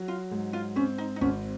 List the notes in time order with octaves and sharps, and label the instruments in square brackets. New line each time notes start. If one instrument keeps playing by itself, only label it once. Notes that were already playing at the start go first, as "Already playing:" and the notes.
Already playing: [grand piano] F#3
[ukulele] F4
[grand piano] G#2
[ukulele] F4
[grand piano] C4 [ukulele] C#4
[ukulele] D#4
D#4
[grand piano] G#1 [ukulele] C#4